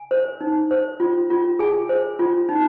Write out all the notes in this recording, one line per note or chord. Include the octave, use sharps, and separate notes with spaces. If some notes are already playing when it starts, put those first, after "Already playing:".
Already playing: G#5
C5
D#4
C5
F4
F4
G#4 G#5
C5
F4
D#4